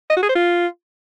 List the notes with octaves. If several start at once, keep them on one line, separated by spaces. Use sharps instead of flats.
D#5
F#4
G#4
C5
F4